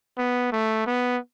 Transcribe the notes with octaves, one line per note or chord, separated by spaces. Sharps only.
B3
A3
B3